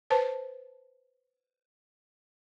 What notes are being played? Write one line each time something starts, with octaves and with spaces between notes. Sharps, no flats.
B4 C5 A5